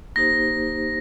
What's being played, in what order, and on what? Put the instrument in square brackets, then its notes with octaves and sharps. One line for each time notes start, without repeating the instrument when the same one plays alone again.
[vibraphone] A#3 D#4 G4 C5 [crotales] A#6